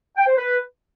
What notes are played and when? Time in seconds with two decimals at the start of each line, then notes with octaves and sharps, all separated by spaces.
0.17 G5
0.27 C5
0.37 B4